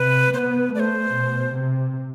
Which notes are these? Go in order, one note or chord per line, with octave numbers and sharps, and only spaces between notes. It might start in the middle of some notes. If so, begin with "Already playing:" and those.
Already playing: C3 B4
B3 B4 C5
A3 D5
C5
B2
C3